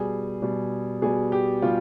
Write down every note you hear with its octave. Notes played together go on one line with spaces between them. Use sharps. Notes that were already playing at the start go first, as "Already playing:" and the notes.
Already playing: B2 G3 G#4
B2 G3
B2 G3 G#4
G4
B2 G3 F4